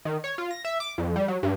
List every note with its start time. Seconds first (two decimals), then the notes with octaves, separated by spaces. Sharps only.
0.05 D#3
0.24 C#5
0.38 F4
0.51 A#6
0.65 E5
0.80 D6
0.98 F2
1.16 G3
1.28 F#3
1.43 G2